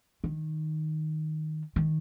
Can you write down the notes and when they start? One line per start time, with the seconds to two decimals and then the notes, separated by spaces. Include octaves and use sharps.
0.24 D#3
1.76 D#3